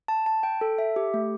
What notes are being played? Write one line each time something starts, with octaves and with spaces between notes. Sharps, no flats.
A5
A5
G5
A4
E5
G4
A3